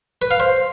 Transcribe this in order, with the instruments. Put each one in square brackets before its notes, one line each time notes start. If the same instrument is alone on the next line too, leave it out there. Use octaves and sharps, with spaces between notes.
[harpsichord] B4
F5
C5